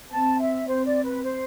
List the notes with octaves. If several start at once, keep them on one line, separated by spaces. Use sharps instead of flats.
C4 A5
E5
C4 C5
D5
B4
C5